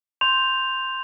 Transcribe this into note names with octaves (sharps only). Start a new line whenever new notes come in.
C6 G6 F7